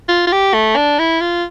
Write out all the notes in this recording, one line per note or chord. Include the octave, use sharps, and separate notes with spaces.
F4
F4
G4
A3
D4
E4
F4